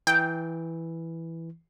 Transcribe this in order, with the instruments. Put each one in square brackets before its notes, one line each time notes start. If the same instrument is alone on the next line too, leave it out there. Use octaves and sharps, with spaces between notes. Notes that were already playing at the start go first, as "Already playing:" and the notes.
[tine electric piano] E3 [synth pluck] G5